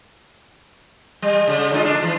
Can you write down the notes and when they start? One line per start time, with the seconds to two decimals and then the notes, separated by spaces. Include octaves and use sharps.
1.22 G3
1.48 C#3
1.72 D3 G#3 F4
1.84 D4
2.03 E3